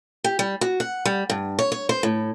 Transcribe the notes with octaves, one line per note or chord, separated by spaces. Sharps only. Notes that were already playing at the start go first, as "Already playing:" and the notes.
G4
G3
F#4
F#5
G3
G2
C#5
C#5
C5
A2